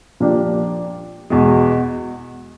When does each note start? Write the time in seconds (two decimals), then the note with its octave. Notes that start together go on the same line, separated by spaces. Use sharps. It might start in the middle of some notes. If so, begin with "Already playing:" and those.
0.20 A#2 F3 A#3 D4 G4
1.30 E2 B2 G#3